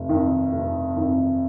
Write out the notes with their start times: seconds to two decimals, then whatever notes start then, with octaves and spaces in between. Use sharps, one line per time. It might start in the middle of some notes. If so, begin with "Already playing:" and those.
Already playing: F1
0.09 F2 D#3
0.52 F1
0.96 F2 D#3